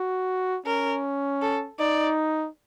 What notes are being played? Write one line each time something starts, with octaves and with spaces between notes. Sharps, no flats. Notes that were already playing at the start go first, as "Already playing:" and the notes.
Already playing: F#4
C#4 A#4
A4
D#4 D5